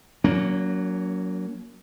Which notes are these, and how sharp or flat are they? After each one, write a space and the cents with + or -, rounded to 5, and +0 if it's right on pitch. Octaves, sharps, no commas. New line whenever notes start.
F#3 +0 A#3 +0 C#4 +40